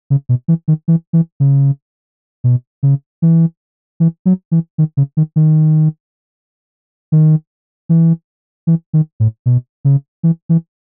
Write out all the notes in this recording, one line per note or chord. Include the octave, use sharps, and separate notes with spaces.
C#3
B2
E3
D#3
E3
E3
C#3
B2
C#3
E3
E3
F#3
E3
D#3
C#3
D#3
D#3
D#3
E3
E3
D#3
A2
B2
C#3
E3
E3